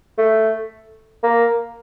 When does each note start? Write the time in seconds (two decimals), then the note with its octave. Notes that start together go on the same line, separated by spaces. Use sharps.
0.18 A3
1.23 A#3